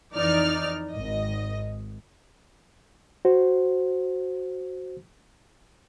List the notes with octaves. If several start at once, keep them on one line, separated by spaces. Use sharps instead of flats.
F2 E3 D#4 D5 F6
G#1 D#5
F#4 C5